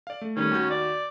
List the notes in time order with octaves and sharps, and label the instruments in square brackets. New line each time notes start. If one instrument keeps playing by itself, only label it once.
[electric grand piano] D5 F5
A3
[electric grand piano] D#3 G3 A3 [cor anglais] C#4
[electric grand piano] D#2 F#4 G6
[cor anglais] D5